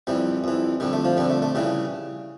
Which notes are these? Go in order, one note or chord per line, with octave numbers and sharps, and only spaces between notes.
F2 E3 G3
F2 E3
F2 D3 G3
A3
F3
F2 D3 G3
A3
A3
C#3 E3 G3